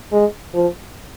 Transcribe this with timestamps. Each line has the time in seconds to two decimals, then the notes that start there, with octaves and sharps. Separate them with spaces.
0.12 G#3
0.54 F3